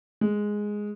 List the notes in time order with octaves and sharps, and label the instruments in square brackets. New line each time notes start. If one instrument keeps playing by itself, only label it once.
[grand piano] G#3